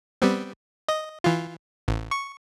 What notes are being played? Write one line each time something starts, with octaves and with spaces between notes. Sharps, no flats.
G3 B3 C4
D#5
E3 F4
A1
C#6